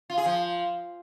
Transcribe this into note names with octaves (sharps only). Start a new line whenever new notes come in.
F4
G#4
F3